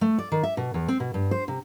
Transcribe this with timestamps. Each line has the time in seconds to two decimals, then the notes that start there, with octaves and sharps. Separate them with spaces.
0.01 A3
0.19 D5
0.32 D#3
0.43 E5
0.57 B2
0.74 E2
0.88 C4
1.00 B2
1.14 G2
1.31 C5
1.48 C3